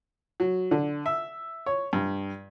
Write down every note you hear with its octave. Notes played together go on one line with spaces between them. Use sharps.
F#3
D3
E5
C#5
G2